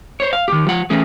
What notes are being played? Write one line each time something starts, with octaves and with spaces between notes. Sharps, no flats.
C5 C#5
F5
D#3 G4
F3 F#5
E3 A3 C#4 G#4